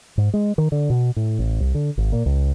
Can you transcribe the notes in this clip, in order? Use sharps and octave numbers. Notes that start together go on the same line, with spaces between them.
G#2
G#3
D#3
D3
B2
A2
A1
C2
D3
G#1
A#2
C#2